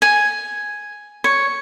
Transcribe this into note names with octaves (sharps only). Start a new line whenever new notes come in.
G#5
C#5